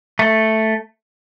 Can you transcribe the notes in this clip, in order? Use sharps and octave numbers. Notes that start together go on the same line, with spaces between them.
A3